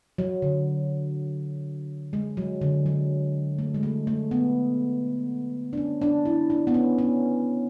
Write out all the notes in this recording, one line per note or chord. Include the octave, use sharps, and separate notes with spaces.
F#3
D3
G#3
F#3
D3
F#3
A3
G#3
A3
A3
B3
D4
C#4
D4
E4
D4
B3
C#4
C#4